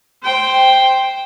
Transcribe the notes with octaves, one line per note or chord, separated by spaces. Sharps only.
C5 G5